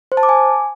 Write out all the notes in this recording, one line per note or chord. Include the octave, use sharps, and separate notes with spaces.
C5
A5
D6
G#5